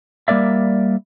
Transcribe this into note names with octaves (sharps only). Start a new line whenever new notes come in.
G3 A#3 A#4 D5 E5